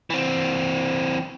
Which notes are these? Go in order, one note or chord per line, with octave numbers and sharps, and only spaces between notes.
E3 C4